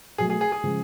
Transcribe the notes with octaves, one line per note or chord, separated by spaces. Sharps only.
B2 F#3 A3 G#4
G#4
G#4
G#4
C#3 F3 G#3